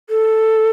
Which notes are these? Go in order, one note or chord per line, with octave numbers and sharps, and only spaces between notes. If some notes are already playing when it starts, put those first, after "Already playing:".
A4